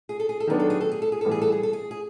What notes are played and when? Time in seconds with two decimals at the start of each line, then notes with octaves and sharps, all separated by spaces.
0.09 G#4
0.20 A4
0.29 G#4
0.40 A4
0.47 D#3 F#3 B3 D4 G#4
0.60 A4
0.70 G#4
0.81 A4
0.92 G#4
1.02 A4
1.12 G#4
1.21 A2 E3 G3 B3 A4
1.31 G#4
1.42 A4
1.52 G#4
1.63 A4
1.73 G#4
1.91 G#4